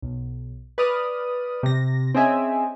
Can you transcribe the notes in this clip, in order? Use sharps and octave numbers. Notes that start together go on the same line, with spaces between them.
B1
B4 D5 D#6 F6
C3 A#6
C4 C#4 G#4 D#5 E5 G#5